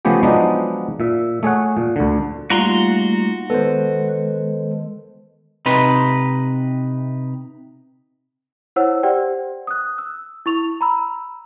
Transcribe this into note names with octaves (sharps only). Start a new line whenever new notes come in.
C#3 F3 A3 B3 G4 G#4
F3 F#3 G#3 B3 D4 D#4
A#2 E5
A3 G#4 C#5 F#5
A#2
D2 D3
G3 A3 A#3 D#4 F4 F#4 A#5 C6
D#3 G#3 B3 A4 C5
C3 D#4 B4 C6
E4 C5 C#5 F#5 E6
G4 C5 D5 F#5 G5
D#6 F#6
E6
E4 C#6 F7
A#5 B5 E6